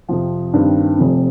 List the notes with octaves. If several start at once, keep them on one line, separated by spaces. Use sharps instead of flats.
F2 C3 F3
G2 D#3 C4
F1 F2 C3